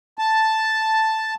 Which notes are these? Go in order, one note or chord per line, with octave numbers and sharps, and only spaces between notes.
A5